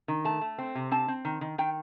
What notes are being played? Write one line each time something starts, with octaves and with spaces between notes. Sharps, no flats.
D#3
A3 A5
A3
C4
C3
C4 A5
C4
D#3
D#3
D#3 G5